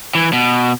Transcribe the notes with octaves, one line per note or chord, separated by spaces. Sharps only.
E3
B2